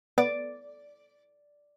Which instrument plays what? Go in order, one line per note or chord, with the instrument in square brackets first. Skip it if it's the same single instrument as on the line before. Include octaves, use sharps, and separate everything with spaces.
[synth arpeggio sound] B3 [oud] D5